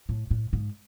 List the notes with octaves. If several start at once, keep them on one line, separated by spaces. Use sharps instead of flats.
A2
A2
G#2